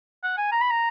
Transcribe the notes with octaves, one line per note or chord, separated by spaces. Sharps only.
F#5
G#5
A#5
B5
A#5